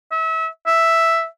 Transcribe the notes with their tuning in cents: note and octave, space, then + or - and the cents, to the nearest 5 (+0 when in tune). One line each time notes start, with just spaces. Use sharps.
E5 -30
E5 +0